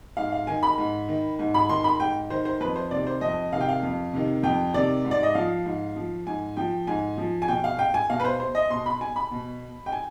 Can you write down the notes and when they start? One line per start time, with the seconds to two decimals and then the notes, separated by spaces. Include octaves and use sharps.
0.17 G#2 F5
0.32 F5
0.47 D#3 G#5
0.63 B5
0.78 G#2
1.09 D#3
1.39 G#2
1.54 B5
1.69 D#3 C6
1.84 B5
2.00 G#2 G5
2.30 D#3 C5
2.45 C5
2.60 F2 B4
2.76 C5
2.91 C3 D#3 D5
3.07 C5
3.21 F2 D#5
3.52 C3 D#3 F5
3.61 G5
3.69 F5
3.83 F2
4.13 C3 D#3
4.43 F2 G5
4.74 C3 D#3 D5
5.05 G#2
5.11 D5
5.23 D#5
5.35 F3 F5
5.66 G#2
5.96 F3
6.27 G#2 G#5
6.57 F3 G5
6.87 G#2 G#5
7.18 F3
7.42 G#5
7.48 B2 G5
7.64 F5
7.79 G5
7.94 G#5
8.09 B2 F5
8.20 B4
8.25 C5
8.40 C5
8.55 D#5
8.70 B2 C6
8.86 B5
9.01 G#5
9.16 B5
9.31 B2
9.86 G5
9.92 G#5